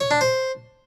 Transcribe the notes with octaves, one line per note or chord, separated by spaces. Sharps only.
C#5
D4
C5